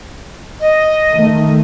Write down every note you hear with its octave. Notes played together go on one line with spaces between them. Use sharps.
D#5
D#3 A3